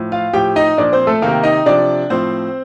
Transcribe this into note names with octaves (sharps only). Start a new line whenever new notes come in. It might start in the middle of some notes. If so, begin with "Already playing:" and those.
Already playing: A2 F3
F4 F5
A2 F3 G4 G5
D#4 D#5
A#2 F3 D4 D5
C4 C5
A3 A4
C3 D#3 A#3 A#4
D#4 D#5
C3 F3 D4 D5
A2 F3 C4 C5